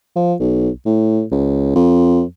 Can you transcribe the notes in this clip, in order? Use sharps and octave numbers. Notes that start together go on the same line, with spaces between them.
F3
B1
A2
C#2
F2